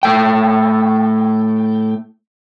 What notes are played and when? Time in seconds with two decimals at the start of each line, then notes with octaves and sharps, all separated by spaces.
0.03 A2 A3 G5